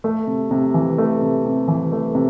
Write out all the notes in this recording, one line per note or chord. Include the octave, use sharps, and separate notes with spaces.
A3
C3
C3
E3
A3
C3
C3
E3
A3
C3